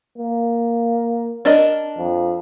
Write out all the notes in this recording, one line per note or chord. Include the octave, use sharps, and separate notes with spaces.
A#3
D4 A#4 D#5
F2